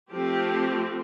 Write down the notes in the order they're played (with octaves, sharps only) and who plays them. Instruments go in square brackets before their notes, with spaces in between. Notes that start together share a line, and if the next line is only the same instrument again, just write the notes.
[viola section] F3 A3 C4 G4